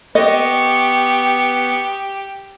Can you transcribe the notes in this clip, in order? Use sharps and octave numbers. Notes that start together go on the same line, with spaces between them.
B3 G4 D#5 C#6